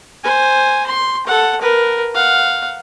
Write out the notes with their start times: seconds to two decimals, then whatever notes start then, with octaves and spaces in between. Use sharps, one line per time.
0.24 C5 G#5
0.87 C6
1.27 A4 F#5
1.62 A#4 B4
2.14 F5 F#5